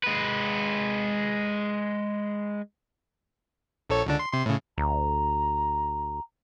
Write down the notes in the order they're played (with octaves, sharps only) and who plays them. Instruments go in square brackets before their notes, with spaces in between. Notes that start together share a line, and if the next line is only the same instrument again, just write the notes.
[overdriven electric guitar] G#3 B4
[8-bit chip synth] A#1 A4 C#5
C#2 D3 D4
C6
C3 C6
A2 C#3
[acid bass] D2 [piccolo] A#5